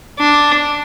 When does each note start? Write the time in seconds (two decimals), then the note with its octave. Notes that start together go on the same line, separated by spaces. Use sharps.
0.19 D4